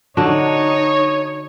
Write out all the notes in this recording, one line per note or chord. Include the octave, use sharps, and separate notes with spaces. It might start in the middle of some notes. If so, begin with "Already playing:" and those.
D3 D4 D#4 F#4 C#5